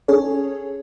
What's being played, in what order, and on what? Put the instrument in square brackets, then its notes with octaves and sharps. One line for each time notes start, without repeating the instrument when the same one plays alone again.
[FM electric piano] C#4 G#4 A4 C#5